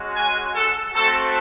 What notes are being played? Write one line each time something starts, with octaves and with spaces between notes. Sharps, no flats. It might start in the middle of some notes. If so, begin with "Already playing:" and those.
Already playing: G#3 C#4 F#4
G#5
A4
A3 C4 F#4 A4